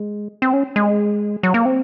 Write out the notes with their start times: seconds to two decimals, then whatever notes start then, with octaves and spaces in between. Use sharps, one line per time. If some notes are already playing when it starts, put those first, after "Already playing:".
Already playing: G#3
0.42 C4
0.53 C#4
0.76 G#3
1.43 F#3
1.54 A#3
1.65 C4